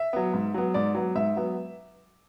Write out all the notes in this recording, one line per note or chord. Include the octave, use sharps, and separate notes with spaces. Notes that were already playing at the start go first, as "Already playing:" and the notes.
Already playing: E5
F#3 B3
G#2
F#3 B3
G#2 D5
F#3 B3
G#2 E5
F#3 B3